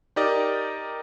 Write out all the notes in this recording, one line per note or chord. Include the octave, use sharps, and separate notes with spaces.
D#4 G4 A#4 D5 D#5